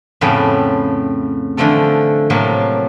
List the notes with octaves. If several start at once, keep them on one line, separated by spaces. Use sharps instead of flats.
F2 A2 C#3 B3 A4 G5
D3 E3 F3 A3 A4
A2 C3 F3 F#3 A#3